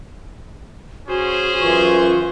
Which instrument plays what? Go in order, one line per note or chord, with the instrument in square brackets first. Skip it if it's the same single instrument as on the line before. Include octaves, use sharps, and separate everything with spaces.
[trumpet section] C#4 G#4 C5 [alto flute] F#4
[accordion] F#2 E3 C#6 [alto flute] F4